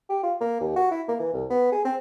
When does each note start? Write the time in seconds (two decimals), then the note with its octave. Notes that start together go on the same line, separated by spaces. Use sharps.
0.09 G4
0.23 F4
0.40 A#3
0.60 D#2
0.76 F#4
0.91 E4
1.08 A#3
1.19 E3
1.34 C2
1.50 B3
1.72 G#4
1.84 C4